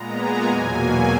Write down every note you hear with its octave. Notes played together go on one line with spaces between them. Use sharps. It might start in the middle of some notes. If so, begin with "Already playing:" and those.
Already playing: A#2 G#3 B3 A#5
G#5
E2 B2 F#3 A#3 G#5